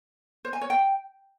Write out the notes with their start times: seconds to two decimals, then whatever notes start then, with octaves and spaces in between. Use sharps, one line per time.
0.45 C5
0.53 G#5
0.61 C#5
0.70 G5